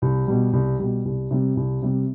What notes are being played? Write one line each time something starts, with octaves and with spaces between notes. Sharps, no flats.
C2
B2 G3
C2
B2 G3
C2
C3 G3
C2
C3 G3